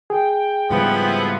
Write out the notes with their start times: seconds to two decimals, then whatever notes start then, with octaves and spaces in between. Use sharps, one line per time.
0.10 G#4 G5
0.70 G#2 C#3 F3 G3 B3 E4